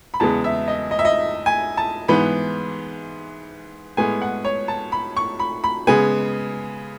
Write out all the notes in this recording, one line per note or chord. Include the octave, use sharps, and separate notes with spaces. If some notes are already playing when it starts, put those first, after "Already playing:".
B5
E2 C#3 G#3 B3 A5
E5
D#5
D#5
E5
D#5
G#5
A5
G#2 E3 B3 B5
A2 G#3 B3 G#5
F#5
C#5
A5
B5
C#6
B5
B5
C#3 G#3 B3 G#5